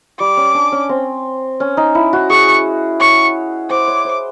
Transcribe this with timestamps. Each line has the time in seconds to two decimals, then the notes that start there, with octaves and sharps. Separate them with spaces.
0.19 G3 D6
0.37 C#4
0.54 D4
0.72 C#4
0.89 C4
1.60 C#4
1.77 D#4
1.95 E4
2.13 F#4
2.30 G#4 C#6
3.00 C#5 C#6
3.70 C5 D6
3.87 C#5
4.05 C5